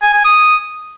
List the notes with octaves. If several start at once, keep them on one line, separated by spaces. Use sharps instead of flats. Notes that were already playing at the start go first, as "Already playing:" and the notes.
G#5
G#5
D#6